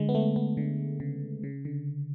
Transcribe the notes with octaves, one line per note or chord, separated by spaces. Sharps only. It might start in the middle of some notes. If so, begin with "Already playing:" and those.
Already playing: D3 G#3
B3
A3
B3
D3
C#3
C#3
D3